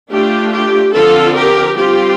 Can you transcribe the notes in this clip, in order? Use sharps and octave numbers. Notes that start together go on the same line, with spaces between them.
A3 D4 F4 G4
G4
D3 F3 C4 F4 A4
G4 A#4
G3 C4 F4 G4